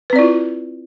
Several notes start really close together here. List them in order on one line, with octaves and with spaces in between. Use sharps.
B4 C4 D5 E4 F4